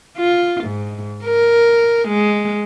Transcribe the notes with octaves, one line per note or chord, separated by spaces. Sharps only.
F4
G#2
A#4
G#3